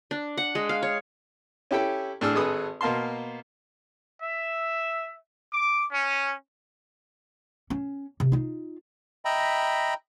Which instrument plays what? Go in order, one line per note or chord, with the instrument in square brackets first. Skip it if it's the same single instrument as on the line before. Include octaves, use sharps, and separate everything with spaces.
[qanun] D4
F#5
G#3
F5
C#5
[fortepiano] C#4 E4 G4 A4 G5
A2 D4 G#4 E6 F6
G#1 G#3 G#4 A4 B4 D#6
B2 A#3 F5 A5 C6
[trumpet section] E5
D6
C#4
[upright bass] C#4
C3
D#4 F4
[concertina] D#5 E5 G5 A#5 B5